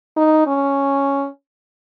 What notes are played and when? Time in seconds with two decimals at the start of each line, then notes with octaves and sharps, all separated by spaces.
0.17 D#4
0.47 C#4